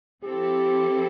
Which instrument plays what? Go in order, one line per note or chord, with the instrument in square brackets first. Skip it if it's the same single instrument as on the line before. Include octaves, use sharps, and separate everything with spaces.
[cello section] F3 C4 E4 A4 [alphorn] G4